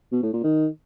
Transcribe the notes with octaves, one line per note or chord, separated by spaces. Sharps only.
B2
A2
A#2
D#3